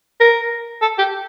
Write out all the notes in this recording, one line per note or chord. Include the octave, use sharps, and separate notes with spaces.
A#4
A4
G4